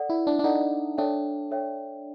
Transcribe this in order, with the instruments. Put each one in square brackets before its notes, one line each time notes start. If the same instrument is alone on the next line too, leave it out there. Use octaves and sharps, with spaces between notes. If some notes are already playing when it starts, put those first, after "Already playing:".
Already playing: [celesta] A4 D5 F#5
[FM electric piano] E4
D4
D4
[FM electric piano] D#4 [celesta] A4 D5 F#5
[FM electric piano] D4 [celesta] A4 C#5 E5 G5
[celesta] A4 C#5 E5 G5